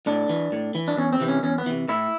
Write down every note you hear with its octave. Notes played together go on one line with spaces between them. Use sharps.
A2 D4
E3
A2
E3
D4
E2 C#4
C4
C3 E3
C#4
E2 C#4
B3
C3 E3
A2 E4